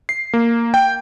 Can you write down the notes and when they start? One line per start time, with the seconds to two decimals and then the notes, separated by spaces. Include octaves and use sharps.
0.09 C7
0.33 A#3
0.74 G5